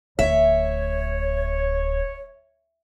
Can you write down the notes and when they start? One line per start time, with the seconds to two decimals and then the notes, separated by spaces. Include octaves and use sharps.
0.19 D1 C#5 E5